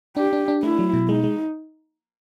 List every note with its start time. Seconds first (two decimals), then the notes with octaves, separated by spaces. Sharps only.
0.16 D4 G4
0.33 D4
0.48 D4
0.63 A3 E4
0.79 F#3
0.93 B2
1.09 G#3 D#4
1.24 G#3